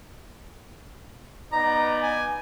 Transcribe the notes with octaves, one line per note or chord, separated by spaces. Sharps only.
B3 D#4 D5 A#5
G#5